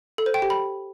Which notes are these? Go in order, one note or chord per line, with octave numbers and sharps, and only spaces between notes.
A4
C5
G5
G4
B5